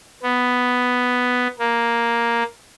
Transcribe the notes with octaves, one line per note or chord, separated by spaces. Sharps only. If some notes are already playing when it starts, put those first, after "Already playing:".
B3
A#3